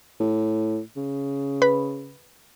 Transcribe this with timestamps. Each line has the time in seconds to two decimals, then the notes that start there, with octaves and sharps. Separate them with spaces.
0.20 A2
0.97 C#3
1.62 B4 B5